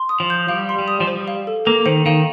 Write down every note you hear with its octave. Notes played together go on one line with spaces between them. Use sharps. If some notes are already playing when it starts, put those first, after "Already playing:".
Already playing: C6
D#6
F3
G6
G3 F5
C6
G3
D#6
F3
G3 C5
F5
A4
A#3 A4
D#3 C5
D#3 F5